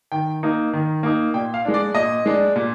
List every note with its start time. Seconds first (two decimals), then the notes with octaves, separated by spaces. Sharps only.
0.12 D#3 G5
0.43 A#3 D#4
0.73 D#3
1.03 A#3 D#4
1.34 A#2 G5
1.54 F5
1.65 G#3 D4
1.74 D5
1.94 A#2 D#5
2.26 G#3 D4
2.56 A#2